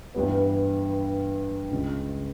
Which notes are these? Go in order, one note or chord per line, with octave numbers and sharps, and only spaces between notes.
G2 E3 G3 B3
C#2 C#3 G#3